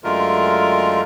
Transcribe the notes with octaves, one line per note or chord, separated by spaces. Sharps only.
F#2 D3 G#3 A3 F4 A#4